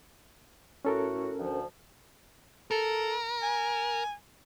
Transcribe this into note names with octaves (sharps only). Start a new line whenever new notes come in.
A2 C#4 F#4 A4 A#4
D2 F3
A4 A#4
G#5